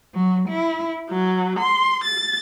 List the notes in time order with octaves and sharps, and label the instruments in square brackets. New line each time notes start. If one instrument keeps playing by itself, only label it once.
[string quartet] F#3
E4
F#3
C6
A6